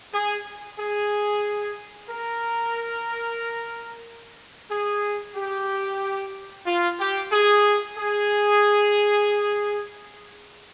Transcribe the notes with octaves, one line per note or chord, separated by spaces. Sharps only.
G#4
G#4
A#4
G#4
G4
F4
G4
G#4
G#4